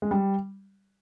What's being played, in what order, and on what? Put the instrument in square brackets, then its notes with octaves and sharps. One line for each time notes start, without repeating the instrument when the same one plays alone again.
[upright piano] G#3
G3